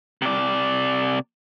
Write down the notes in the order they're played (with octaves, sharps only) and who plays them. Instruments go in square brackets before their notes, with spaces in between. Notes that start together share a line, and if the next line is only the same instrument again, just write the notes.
[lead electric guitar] C3 D5